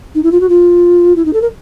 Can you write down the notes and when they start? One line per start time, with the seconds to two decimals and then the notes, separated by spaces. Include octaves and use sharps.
0.15 D#4
0.23 E4
0.31 F4
0.40 F#4
0.49 F4
1.16 E4
1.25 D#4
1.33 A4
1.41 A#4